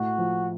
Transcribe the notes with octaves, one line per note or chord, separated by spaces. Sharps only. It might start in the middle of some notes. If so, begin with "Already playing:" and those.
Already playing: A2 F#4
F3